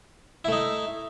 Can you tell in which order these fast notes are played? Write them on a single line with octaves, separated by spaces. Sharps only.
E4 A3 D#4